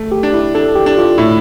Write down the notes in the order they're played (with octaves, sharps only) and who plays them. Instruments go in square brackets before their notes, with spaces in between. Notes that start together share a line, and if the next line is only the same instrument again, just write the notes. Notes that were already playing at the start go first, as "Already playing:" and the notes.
Already playing: [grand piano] A3
[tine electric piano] G4
[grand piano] D4
[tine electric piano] E4
[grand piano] D4 [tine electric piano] A4
[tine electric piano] G4
[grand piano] D4
[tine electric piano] F4
[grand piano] A2 [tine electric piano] E4